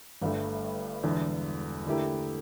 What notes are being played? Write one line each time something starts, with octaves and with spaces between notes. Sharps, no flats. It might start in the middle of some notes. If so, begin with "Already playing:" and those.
G1 G2 D3 A3
E1 E2 D3
D3 A3 E4 G4 A#4